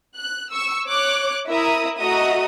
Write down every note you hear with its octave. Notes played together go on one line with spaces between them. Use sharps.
F#6
C#6 E6
C#5 D6 F#6
E4 A#4 E5 A#5 D#6
A3 F#4 D#5 E5 A#5 D#6